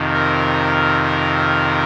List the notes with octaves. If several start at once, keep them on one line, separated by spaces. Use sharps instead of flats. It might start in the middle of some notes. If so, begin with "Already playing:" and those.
Already playing: F2 C3 D#3
A#4